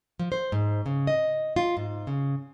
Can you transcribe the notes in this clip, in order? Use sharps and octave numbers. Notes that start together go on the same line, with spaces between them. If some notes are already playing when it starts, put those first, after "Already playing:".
F3
C5
G#2
C#3
D#5
F4
G#2
C#3